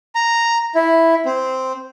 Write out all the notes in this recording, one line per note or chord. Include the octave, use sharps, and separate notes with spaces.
A#5
E4
C4